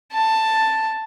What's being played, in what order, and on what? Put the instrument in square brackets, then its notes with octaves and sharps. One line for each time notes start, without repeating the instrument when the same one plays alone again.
[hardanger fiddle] A5